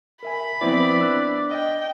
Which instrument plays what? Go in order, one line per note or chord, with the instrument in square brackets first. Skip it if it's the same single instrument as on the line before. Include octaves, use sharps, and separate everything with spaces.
[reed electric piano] A#4 E5 G#5 [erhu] B5
[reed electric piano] F3 B4 [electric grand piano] B3 C4 E4 [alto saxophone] D5
[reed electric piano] D4 E6 F#6
[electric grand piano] D#5 [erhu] G5